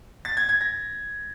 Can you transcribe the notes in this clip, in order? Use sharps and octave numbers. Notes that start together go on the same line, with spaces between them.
A6
G#6
G#6
A#6